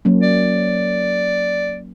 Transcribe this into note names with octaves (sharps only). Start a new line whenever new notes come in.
F#3 A#3 C#4
D5